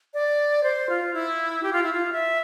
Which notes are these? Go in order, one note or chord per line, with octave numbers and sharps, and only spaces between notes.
D5
C5
F4
E4
G4
F4
E4
F4
E5